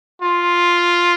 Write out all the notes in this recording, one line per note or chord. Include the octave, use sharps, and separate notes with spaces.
F4